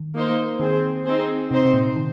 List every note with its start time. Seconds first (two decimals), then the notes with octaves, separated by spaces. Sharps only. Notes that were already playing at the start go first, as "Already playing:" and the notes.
Already playing: D#3
0.15 A#3 D#4 C5
0.60 D#3 C4 G#4 C5
1.05 C4 D#4 G#4 C5
1.51 C3 C4 D#4 C5
1.65 C3
1.73 A#2
1.96 D#3